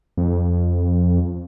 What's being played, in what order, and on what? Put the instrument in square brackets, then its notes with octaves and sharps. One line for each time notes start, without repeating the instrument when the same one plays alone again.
[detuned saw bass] F2